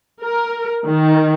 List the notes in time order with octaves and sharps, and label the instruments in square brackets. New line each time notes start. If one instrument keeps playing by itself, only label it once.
[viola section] A#4
D#3